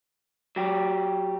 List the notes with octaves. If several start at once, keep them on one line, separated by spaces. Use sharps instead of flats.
F#3 G4